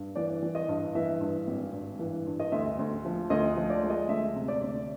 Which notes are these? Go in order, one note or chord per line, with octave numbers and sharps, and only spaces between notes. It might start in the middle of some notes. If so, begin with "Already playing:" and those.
Already playing: G2
E3 D5
E3
D#5
G2
E3 E5
G2
G#1
G2
E3
G2
D#5
D2 E5
D2
F3
D2 D#5
F3
D5
G#3
D#5
D2 E5
C3
D5
D2